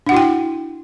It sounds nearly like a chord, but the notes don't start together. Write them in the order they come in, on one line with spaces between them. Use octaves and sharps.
D4 F#5 F#4 E4 G5